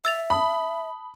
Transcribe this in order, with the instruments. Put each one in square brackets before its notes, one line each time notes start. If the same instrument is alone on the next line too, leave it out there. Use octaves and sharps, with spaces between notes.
[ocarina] E5 [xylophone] E6 A6 F7
[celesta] A5 D#6 [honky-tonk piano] B5